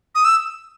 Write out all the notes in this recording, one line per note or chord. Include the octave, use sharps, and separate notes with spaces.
D#6
E6